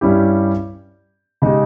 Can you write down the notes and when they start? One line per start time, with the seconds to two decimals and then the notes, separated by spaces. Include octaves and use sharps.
0.01 G2 G3 C#4 E4 G4
1.42 C#3 G#3 D#4 G4